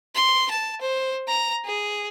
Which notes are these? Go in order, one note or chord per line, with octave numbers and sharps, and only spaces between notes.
C6
A5
C5
A#5
G#4